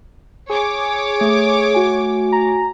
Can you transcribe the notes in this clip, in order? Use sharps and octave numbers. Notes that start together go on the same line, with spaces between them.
G#4 C#5 D6
A3
F#4 G#5
A#5